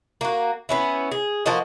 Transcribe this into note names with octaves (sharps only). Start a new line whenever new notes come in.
A#3 F#4
B3 C#4 E4
G#4
F3 A#3 F#4 D#5